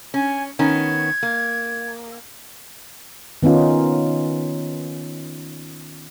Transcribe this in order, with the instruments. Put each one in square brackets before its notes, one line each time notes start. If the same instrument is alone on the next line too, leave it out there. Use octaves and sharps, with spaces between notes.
[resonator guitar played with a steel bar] C#4 [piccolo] G#5
[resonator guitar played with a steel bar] D#3 B3 C#4 [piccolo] G#6
[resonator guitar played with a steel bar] A#3
[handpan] D#3 B3 C#4 D#4 F4